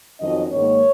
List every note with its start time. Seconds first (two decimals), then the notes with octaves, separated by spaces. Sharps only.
0.19 F2 D#3 F#3 C#4 D#5
0.50 G#2 D#3 A#3 C#5